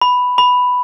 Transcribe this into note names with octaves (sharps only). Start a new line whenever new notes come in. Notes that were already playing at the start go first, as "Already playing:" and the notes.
B5
B5